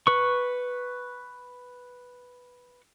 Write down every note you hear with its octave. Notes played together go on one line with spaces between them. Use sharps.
B4 C#6